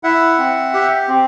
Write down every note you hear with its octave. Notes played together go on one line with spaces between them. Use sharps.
E4 E5 F#5
C4
G4
C4